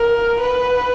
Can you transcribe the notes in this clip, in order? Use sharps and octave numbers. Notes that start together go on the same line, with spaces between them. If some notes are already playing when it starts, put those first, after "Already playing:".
Already playing: A#4
B4